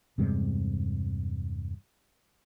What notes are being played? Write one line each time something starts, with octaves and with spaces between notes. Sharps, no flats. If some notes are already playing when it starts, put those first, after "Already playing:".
E2 G2 C3 G#3